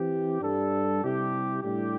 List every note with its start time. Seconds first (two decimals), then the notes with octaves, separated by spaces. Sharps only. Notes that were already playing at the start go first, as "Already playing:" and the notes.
Already playing: E3 C4 G4
0.40 G2 G3 D4 A4
1.02 C3 G3 E4 G4
1.63 A2 G3 D4 G4